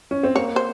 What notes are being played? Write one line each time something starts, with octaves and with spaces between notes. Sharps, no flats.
C#4
C4
A#3 C#5
C5